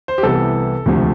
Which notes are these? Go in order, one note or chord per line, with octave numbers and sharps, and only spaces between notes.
C5
G4
C2 C3 E3 B3 A4
E1 D2 C3 F3 A3